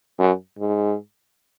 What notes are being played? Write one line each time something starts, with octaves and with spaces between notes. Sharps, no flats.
F#2
G#2